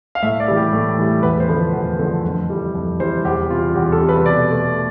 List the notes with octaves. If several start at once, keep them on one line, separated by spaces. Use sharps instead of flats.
F5
A2 E5
D5
E3 G3
G4
A2
E3 G3
E2 B4
C5
D3 F3 A3 B4
E2
D3 F3 A3
F2
E3 G3
F2
E3 G3 C5
E2 G4
C3 G3 F4
E2 G4
A4
C3 G3
B4
B2 D5
A3